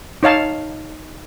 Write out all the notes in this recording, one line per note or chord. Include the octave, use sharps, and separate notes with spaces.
D#4 C#5 F5 A5